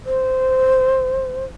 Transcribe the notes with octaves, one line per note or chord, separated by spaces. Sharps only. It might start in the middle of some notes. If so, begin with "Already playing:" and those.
C5